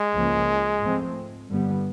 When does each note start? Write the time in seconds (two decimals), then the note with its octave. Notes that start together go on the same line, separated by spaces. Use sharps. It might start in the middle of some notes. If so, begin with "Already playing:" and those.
Already playing: G#3
0.14 C#2 C#3 F3 A#3 C#4
0.81 G#2 F3 A3 C4
1.49 G2 D3 G3 B3